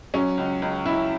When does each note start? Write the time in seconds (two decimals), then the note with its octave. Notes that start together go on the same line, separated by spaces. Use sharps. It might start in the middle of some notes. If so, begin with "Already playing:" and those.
0.14 F#3 C#4
0.38 C#2
0.62 C#2
0.85 C#2 E4